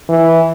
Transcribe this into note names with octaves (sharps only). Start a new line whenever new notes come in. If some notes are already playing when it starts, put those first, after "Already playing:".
E3